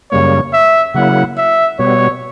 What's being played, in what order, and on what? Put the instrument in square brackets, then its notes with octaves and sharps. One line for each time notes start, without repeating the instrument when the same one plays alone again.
[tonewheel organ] F#2 C#3 G3 A#3 [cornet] C#5
[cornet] E5
[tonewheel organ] C#3 F#3 A#3 E4 [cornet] F#5
[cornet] E5
[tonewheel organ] B2 G3 B3 [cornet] C#5